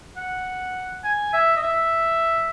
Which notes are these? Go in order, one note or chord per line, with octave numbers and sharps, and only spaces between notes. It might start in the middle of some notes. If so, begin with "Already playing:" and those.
F#5
G#5
E5
D#5
E5